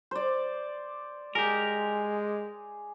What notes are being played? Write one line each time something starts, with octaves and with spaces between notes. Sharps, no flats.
C5 D5
G#3 G4 G#4 A#4